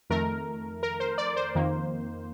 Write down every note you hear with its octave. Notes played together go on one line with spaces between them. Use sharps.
F2 D#3 A3 A#4
A#4
C5
D5
C5
F2 D#3 A#3